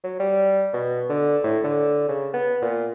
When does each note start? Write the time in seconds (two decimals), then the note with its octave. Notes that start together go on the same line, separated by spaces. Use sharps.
0.04 F#3
0.19 G3
0.73 B2
1.09 D3
1.43 A2
1.64 D3
2.08 C#3
2.33 B3
2.62 A#2